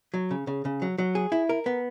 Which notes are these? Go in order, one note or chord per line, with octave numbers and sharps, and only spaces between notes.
F#3
C#3
C#3
C#3
F#3
F#3
G#4
E4
A#4
B3